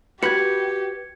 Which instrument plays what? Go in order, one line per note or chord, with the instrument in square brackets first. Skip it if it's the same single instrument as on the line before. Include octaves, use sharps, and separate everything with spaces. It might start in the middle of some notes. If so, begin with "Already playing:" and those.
[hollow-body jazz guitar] F#4 B4 B5 [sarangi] G4 [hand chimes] G#6 C#7